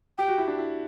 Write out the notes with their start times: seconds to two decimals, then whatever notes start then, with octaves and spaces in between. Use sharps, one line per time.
0.18 G4 G5
0.28 F#4
0.38 E4
0.48 D4
0.58 E4